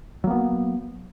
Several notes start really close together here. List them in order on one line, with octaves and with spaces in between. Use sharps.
F#3 A#3 B3